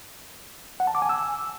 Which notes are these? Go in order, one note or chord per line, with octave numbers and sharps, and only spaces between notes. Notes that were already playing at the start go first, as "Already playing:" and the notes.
F#5
A5
D6
G#5
E6